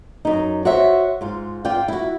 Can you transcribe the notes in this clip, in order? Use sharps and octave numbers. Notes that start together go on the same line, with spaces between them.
F#2 D#4
F#4 C5 C#5 E5
G#2 F4
F4 D5 G5
E4 F#4